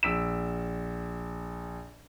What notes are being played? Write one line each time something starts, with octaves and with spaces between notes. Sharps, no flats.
A#1 E6 B6 D7 E7